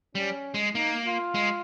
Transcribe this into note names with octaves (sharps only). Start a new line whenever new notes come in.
G3 C#4
G#3
A#3 D#4
F4
G#3